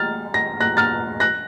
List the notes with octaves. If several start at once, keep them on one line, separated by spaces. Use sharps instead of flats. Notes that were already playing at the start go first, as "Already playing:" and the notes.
Already playing: F6 A6
A#6
F#6 A#6
F6 A6
F#6 A#6